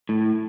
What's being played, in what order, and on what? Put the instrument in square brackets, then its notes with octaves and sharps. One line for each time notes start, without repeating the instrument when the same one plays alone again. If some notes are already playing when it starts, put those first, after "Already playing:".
[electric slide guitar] A2